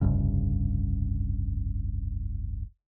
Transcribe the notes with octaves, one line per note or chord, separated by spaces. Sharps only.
F1 C2 G2 C#3